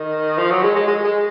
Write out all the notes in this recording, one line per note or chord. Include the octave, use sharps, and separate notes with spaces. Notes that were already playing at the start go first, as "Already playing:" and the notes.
Already playing: D#3
F3
F#3
G#3
G#3
G#3
G#3